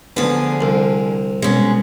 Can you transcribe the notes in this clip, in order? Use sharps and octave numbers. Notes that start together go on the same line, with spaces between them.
D2 D3 F3 B3 G#4
C2
B2 G#3 C#4